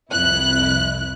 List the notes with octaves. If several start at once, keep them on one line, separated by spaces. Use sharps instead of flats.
C2 F2 E4 F#6